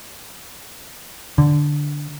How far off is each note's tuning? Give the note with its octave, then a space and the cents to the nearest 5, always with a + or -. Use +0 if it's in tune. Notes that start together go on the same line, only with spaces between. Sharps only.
D3 +0